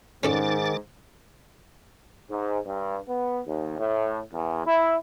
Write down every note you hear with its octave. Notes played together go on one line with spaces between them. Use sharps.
G#2 D#3 C#4 A4 D5 D6 A6
G#2
G2
B3
D#2
A2
E2
E4